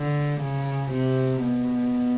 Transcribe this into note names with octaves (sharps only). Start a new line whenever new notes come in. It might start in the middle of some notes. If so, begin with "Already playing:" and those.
Already playing: D3
C#3
C3
B2